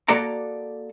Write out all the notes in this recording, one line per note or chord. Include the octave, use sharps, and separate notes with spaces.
A#3 F#4 A4 D5 A#5